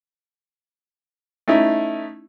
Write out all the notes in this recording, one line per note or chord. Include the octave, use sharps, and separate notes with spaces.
A3 C#4 D#4 E4